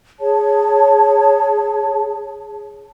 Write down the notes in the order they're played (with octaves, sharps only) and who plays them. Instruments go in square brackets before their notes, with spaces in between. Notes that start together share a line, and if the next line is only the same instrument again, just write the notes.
[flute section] G#4 C#5 A5